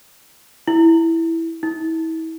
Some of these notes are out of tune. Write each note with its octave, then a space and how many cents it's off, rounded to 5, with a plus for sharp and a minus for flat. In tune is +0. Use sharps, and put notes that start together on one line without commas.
E4 +0
E4 -35